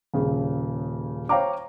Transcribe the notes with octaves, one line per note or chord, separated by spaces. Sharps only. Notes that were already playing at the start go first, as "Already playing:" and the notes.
D#1 C#3
C5 C#5 F5 G5 A#5 D6